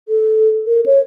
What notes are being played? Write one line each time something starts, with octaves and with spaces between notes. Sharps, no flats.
A4
A#4
C#5